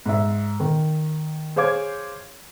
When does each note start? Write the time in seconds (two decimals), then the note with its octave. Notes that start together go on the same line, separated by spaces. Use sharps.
0.06 G#2 E5
0.60 D#3
1.56 G#4 C5 C#5 F5 D6 G#6